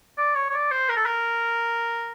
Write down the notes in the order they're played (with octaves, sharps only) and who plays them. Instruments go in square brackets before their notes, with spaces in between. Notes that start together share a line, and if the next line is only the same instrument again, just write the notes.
[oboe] D5
C#5
C#5
D5
C5
A#4
A4
A#4